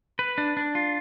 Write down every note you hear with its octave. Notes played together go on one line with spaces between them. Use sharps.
B4
D4
D4
F4